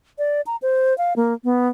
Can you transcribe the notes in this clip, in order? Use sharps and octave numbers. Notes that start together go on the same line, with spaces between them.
D5
A#5
C5
F5
A#3
B3